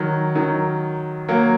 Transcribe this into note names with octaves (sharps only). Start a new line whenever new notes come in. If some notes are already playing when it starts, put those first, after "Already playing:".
Already playing: D#3 F#3
D#3 F#3
F#3 A#3